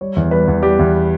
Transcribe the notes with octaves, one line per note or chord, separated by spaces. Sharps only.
G3 C#5
E2
G3 B4
E2
G3 G4
E2